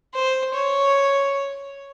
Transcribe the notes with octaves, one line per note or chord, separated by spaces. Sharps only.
C5
C#5